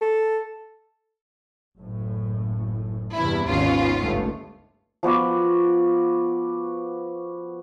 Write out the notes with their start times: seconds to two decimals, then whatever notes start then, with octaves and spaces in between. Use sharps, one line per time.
0.01 A4
1.78 F#1 A2
3.15 E2 G2 C3 E4
3.48 G#1 D#2 B3 C#4 F4
4.00 G1 C#2 A3
5.03 F3 B3 F#4 D5